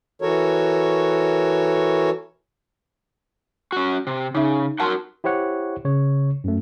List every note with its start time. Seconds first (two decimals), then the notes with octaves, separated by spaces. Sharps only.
0.22 E3 F#4 A4 A#4 C#5
3.72 C#4 F#4
4.07 C3
4.35 C#3 D#4 E5
4.80 F#4 A#4 F#5 A5 C6
5.24 E4 G4 C5 C#5 F#5
5.85 C#3 C#5
6.44 F#2 A3